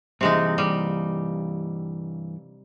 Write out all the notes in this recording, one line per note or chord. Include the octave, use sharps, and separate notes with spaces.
G2 C3 E3 G#3 D#4
G3